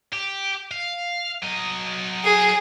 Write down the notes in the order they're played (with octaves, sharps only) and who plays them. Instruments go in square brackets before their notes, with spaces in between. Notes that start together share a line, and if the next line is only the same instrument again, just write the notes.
[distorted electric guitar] G4
F5
F#3 D#5
[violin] G#4